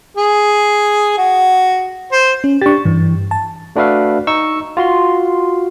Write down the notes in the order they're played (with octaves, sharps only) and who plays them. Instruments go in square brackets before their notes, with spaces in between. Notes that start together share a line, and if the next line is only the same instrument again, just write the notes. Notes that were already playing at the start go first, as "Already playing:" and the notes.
[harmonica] G#4
F#4
C5
[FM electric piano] C#4
[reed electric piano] D4 G4 [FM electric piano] C#6 A6
[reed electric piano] G2 [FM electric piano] E3
[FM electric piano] A5
[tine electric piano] A3 D4 F#4 B4 E5 F5
D#4 C#6 E6
F4 F#4 C6